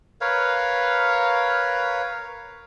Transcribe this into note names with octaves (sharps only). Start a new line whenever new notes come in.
A#4 B4 C#5 F5